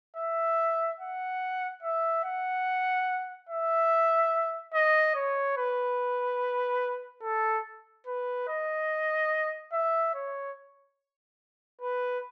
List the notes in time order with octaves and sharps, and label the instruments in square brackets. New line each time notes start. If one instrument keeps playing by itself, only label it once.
[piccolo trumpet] E5
F#5
E5
F#5
E5
D#5
C#5
B4
A4
B4
D#5
E5
C#5
B4